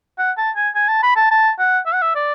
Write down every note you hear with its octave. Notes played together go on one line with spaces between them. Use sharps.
F#5
A5
G#5
G#5
A5
B5
A5
A5
F#5
E5
F#5
E5
D5